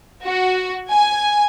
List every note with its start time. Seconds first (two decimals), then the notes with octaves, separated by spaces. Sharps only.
0.24 F#4
0.90 G#5